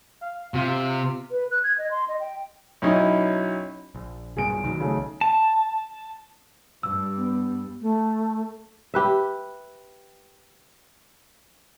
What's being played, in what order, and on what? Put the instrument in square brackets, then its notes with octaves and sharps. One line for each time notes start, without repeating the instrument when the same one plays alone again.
[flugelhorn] F5
[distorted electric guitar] C3 [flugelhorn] F4
[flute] B4
F#6
G#6
D#5
C6
D#5
G5
[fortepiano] B1 F#3 C#4 D#4 E4 D#5
[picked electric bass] A#1
[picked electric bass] B1 G2 A#2 [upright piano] G#4 D7
[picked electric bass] B1 D#3 F#3
[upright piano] C#3 A3
[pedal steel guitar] A5
[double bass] G2 G3 [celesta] E6
[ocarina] B3
[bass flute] A3
[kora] G4 B4 E5